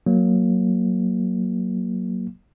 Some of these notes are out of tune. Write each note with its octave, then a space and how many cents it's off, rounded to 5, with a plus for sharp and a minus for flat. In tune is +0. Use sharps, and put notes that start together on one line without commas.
F#3 +0 A#3 +0